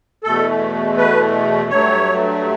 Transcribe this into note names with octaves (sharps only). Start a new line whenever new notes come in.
E2 B2 A3 A4
B4
G2 F#3 A3 C#5